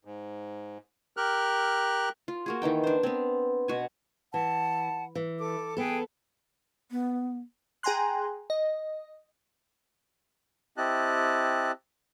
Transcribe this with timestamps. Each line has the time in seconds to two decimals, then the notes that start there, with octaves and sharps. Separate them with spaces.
0.05 G#2
1.17 G4 A#4 F6 F#6
2.28 F4
2.46 A#3 F#4 G#4
2.62 D#3 E3 D#4 G5
2.84 D4 C5
3.03 B3 C4
3.68 B2 F#4 G#5
4.34 E3 F#5 A5
5.15 E3
5.38 A4 D6
5.77 B3 G#4 A4 B4 G5
6.91 B3
7.83 G#4 G5 G#5 A#5 C6 F#6
8.50 D#5
10.77 C4 E4 G4 D#5 A5 F#6